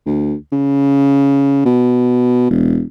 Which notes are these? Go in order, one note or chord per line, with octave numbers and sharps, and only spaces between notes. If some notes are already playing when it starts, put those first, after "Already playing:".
D2
C#3
B2
E1